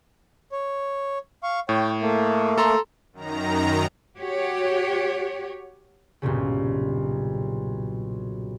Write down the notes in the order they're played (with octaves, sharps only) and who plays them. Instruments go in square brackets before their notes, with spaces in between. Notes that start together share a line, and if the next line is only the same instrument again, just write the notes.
[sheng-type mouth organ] C#5
F5 C#6
[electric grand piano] A2 [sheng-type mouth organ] C#5 G5
[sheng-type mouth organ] A3 A#3
[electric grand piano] A4 A#5 C6
[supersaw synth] F#2 D#3 A#5
[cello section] F#4 G4 C#5
[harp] B1 G2 A#2 C#3